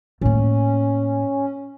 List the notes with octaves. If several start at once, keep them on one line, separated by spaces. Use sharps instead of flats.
A2 A#3 C#4